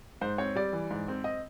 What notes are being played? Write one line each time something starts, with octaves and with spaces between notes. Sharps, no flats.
G#2 C5
C4 C#5
G3 D5
E3
G#2
C4
D#5